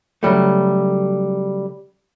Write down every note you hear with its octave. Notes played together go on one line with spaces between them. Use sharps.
C#3 F#3 G3 A3